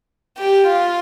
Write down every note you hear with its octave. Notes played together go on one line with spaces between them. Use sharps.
G4
F4